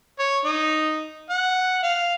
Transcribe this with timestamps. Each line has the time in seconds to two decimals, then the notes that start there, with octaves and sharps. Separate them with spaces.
0.19 C#5
0.45 D#4
1.30 F#5
1.83 F5